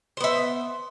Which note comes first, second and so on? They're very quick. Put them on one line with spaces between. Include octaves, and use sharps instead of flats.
C5 B3 E5